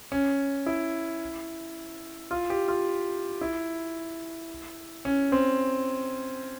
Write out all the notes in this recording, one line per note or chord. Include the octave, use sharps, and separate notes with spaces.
C#4
E4
F4
G4
F4
E4
C#4
C4